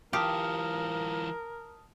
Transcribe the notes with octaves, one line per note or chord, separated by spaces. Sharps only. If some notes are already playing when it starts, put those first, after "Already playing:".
E3 F4 G4 A#4 A5 D#6 F6